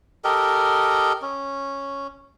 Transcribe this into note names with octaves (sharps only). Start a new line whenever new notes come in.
G4 A4 A#4 D#5
C#4